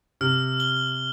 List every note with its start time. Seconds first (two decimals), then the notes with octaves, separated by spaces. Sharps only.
0.21 C3 F6
0.60 G7